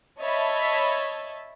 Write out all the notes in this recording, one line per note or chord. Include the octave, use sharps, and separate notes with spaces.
C#5 D#5 E5 A5 B5